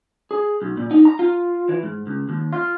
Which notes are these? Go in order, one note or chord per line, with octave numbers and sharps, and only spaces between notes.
G#4
B1
A#2
D#4
A#5
F4
E3
G#2
C#2
D#2
F4